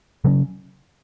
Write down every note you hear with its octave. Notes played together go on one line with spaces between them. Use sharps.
C#3 F#3 C#4